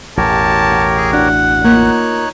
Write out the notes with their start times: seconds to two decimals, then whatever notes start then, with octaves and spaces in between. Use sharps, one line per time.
0.17 A1 E2 B2 G4 A#4 C#5 A5
0.71 F#5
0.97 G#4
1.13 D4 F#4 F#5
1.64 A#3 D#4 F4 C#5 F#6